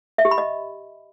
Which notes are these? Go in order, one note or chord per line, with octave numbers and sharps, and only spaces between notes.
E5
G4
B5
D#5